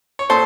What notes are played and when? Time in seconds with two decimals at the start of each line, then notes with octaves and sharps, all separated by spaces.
0.19 C#5
0.30 A#2 A4 C5